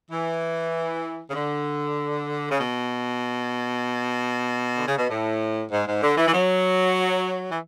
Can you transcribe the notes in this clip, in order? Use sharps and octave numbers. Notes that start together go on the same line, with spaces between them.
E3
C#3
D3
C#3
B2
D3
C#3
B2
A2
G#2
G#2
D3
E3
E3
F#3
E3